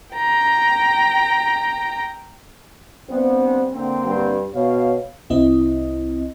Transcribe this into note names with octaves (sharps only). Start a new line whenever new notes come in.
G5 A#5
G2 B3 C4
D3 A#3 C4
G2
B2 C#5 F5
C2 C4 E4 D#5